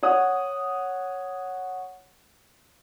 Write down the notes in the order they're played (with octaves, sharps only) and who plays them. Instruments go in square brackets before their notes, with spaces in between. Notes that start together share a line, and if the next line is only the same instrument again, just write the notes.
[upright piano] C#5 F#5 D#6